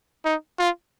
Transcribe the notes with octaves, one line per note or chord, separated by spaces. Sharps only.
D#4
F4